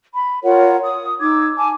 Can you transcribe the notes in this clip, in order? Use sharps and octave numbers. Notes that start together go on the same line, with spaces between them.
B5
F4 A#4 C#5 F#5
D#6
D#4 D6 E6 G#6
G#5 A5 D6